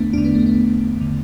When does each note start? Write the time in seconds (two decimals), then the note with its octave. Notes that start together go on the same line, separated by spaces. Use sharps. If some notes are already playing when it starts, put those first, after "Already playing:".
Already playing: E2 D3 A3 B3 D4
0.13 E2 D3 D4
0.25 B3
0.35 A3
0.46 B3
0.97 E2 D3